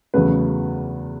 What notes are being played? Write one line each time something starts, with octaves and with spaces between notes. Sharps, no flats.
E2 C#3 F#3 A3 B4